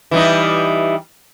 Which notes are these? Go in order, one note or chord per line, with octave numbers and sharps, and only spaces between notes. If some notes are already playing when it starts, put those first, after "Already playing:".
E3 G3 D#4